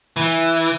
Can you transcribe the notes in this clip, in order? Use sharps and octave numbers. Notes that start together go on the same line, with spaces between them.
E3